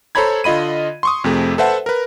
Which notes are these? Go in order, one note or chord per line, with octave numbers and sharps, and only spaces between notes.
A4 C5 C#5 A#5 B5 G#6
D3 F4 D#5 B5 D#7
C6 C#6 D#6
F2 C3 A3 G#4
A4 B4 C5 E5 F#5 A5
A#4 B4